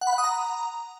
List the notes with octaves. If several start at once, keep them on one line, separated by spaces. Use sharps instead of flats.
F#5
B5
F#5
D#6
A#5